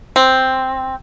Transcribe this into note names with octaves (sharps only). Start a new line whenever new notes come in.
C4